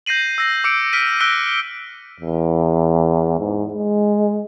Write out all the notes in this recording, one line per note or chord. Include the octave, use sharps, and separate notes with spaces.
G6 A#6 C7 D#7 F#7
E6 A#6 C7
D6 E6 C#7 D7
F6 B6 D7 D#7
E6 F#6 A#6 B6 D7 G7
E2
G#2
G#3